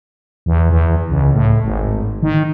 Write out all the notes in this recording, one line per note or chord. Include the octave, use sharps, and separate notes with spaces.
E2
E2
C#2
A2
G#1
D#3